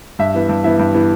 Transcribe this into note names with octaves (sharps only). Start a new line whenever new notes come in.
G2 E5
E3 B3
G2
E3 B3 E5
G2
E3 B3